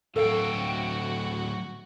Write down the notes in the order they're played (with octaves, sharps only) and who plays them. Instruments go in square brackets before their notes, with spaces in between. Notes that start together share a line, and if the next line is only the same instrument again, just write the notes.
[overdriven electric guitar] D2 G5 [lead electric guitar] A2 F#3 [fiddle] F#4 [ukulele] A4 F5